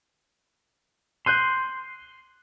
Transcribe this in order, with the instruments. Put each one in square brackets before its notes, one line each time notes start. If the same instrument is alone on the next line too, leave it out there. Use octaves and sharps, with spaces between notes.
[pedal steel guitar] C6 [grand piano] F#6 G6 D#7